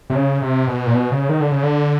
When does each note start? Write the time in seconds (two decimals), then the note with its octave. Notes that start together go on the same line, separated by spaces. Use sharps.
0.10 C3
0.15 C#3
0.42 C3
0.67 B2
0.86 A#2
0.94 B2
1.11 C#3
1.29 D#3
1.41 D3
1.51 C#3
1.63 D3